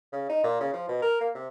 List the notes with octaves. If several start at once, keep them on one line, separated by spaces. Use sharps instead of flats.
C#3
D#4
A#2
C#3
F3
B2
A#4
A#3
C3